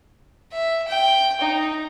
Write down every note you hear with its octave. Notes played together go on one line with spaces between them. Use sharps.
E5
G5
D#4